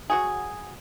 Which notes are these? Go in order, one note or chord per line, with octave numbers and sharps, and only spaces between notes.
F#3 F#4 G#4